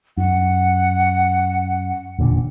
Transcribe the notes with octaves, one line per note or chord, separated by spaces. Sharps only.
F#2 F#5
E1 A#2 D3